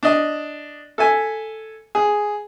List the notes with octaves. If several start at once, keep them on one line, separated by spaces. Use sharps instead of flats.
D4 D#5
A4 E5 G#5
G#4